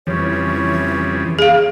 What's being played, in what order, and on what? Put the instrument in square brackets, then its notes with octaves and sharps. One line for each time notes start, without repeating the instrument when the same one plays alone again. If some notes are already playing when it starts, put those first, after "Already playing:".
[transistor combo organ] F2 C#3 G3 [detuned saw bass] E3 [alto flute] C#5
[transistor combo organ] A#3 [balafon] G#4 F5